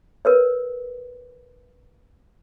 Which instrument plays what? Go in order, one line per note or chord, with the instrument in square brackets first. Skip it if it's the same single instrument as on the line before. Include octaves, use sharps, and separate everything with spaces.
[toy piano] A#4 B4 C#5